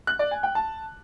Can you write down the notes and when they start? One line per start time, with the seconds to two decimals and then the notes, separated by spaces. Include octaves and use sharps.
0.07 F#6
0.19 D5
0.31 G#5
0.43 G5
0.55 A5